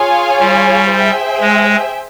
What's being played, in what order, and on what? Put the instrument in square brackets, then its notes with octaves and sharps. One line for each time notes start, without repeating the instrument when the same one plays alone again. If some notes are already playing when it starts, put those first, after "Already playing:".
Already playing: [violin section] F4 G#4 C#5 F5 G#5
[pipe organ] G3
[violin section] G#4 C5 E5 G5
[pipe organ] G#3